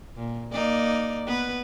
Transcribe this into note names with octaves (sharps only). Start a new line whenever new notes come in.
A#2
A#3 D#4 D5
B3 B4